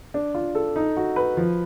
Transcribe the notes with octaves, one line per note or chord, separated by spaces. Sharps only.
D4
F4
A4
D#4
F#4
B4
F3